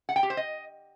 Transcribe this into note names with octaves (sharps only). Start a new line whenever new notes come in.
F#5
G5
G4
C5
D#5